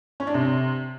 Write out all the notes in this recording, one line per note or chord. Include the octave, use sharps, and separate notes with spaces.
C#4
D4
C3